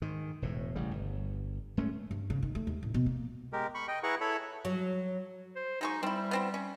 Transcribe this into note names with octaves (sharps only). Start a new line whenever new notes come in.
G#2 D#3
E1 A2
A1 C#3 G3
G1
D1 G#3 A3 C#4
G2
C#3
D#3
A3
D#2
A1
B2
A#3
G#3 G4 A#4
B5 C#6
D#5 G5
E4 G#4 B4 F#5 A#5 C#6
E4 A4 C#5 B5
F#3
C5
F#3 G#3 D#4 C#6
G3 C4 E4
B3 C4 E4
C#4